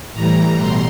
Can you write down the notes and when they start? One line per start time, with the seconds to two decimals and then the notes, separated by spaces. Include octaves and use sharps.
0.14 A2 E3 G3 A#5
0.57 B2 C6